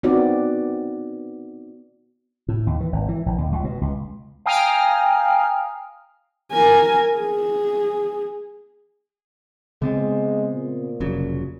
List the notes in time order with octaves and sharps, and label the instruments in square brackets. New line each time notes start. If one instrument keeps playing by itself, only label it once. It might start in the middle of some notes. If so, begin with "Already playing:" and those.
[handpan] B3 C4 D#4 F#4 D5
[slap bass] A2
D#2
E3
G#1
E3
A#1
D#2
C#2
B2
C#2
[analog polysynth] F5 G5 G#5 A#5 D#6 F6
[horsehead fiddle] A#4 G#5
G#4
[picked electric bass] C#3 B3 C4 [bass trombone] G#3
[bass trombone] A#2
[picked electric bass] F1 C#3 F#3